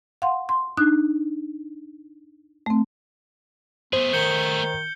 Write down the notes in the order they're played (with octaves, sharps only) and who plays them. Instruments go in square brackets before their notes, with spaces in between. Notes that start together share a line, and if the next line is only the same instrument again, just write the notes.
[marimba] F5 F#5 C6
C6
D4 D#4 F#6
A3 C4
[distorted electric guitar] A3 G#4 [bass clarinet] B3 [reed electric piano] C5
[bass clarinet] D#3 [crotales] G6 C#7 G7